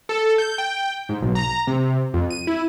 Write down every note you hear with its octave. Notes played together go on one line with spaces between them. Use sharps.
A4
G6
G5
G#2
B1
A#5
C3
F2
D#7
E4